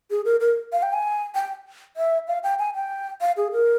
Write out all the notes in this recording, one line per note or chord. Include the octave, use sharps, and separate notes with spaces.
G#4
A#4
A#4
F5
G5
G#5
G5
E5
F5
G5
G#5
G5
F5
G#4
A#4